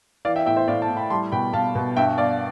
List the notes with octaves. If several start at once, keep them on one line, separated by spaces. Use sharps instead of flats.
E3 D5 F5
E5 G5
A2 E5 G5
C5 E5
A2 D5 F5
F5 A5
A2
G5 B5
G3 A5 C6
B2 G5 B5
B2 F5 A5
B2
G2 E5 G5
G2 D5 F5